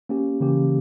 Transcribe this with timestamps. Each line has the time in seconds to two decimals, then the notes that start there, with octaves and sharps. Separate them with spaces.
0.09 A#3 C#4 G4
0.40 C#3 E3 A#3 C#4 G4